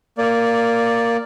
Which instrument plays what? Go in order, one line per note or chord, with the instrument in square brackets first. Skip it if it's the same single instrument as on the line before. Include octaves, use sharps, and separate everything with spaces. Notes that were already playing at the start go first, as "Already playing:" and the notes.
[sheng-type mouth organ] A#3 D5